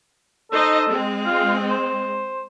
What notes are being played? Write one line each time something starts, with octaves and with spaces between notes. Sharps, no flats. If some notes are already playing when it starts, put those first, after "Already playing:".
D#4 A4 C5 D#5
G#3 C4
F4
C5